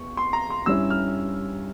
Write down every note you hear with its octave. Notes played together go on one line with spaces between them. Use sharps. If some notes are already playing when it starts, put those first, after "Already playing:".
Already playing: E2 C#6
C6
A#5
C6
G2 G3 C#4 E4 E6
F6